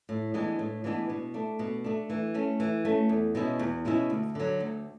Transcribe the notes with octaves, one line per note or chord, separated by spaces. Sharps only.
A2
E3 G#3 B3 D4
A2
E3 G#3 B3 D4
B2
A3 D4
B2
A3 D4
E3
A3 C#4
E3
A3 C#4
E2
B2 G#3 C#4 E4
E2
B2 G#3 C#4 E4
D2
D3 F#3
D2